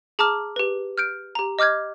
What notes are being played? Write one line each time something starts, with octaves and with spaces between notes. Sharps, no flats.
G#4 A5 A#5 D6 F6
G4 B4
F6 G6 D7
G4 A#5
D#5 D6 F6 G6 G#6